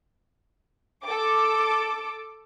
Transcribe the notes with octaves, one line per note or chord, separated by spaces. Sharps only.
A4 D6